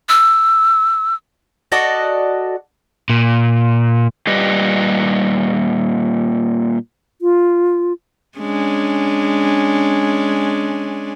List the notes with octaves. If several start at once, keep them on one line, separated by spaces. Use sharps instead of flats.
E6
F#4 A4 D5 D#5
A#2
A#2 G3 G4 B4 D#5
F4
G#3 C#4 D4